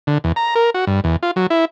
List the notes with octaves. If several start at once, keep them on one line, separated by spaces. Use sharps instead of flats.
D3
E2
A#5
A#4
F#4
G2
E2
F4
F#3
E4